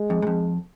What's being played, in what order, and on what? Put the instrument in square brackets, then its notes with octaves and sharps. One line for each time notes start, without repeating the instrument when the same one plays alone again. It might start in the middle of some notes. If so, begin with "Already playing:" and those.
Already playing: [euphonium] G#3
[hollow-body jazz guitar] F2
G#2
F2